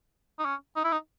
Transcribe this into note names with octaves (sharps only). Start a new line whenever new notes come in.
D#4
C#4
D#4
E4
D#4